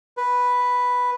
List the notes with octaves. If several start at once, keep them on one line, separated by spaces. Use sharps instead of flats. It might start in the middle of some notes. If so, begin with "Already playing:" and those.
B4